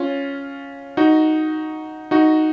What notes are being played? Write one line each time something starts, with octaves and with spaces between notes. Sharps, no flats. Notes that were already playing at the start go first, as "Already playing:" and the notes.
Already playing: C#4 F4
D#4 F#4
D#4 F#4